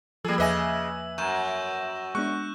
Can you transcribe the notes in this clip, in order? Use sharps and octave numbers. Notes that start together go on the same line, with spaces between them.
F3 G3 A#3 G#4 A4 E6
E2 C#3 B4 D#5 E5 G#5 D6 E6
F#2 C#6 G6 E7
G#3 B3 D4 C#6 F#6